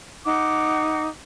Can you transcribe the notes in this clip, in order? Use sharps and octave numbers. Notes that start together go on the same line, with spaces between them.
D#4 F#5 D6